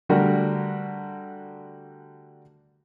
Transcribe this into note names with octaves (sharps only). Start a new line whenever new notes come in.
D3 G3 A3 F#4 A#4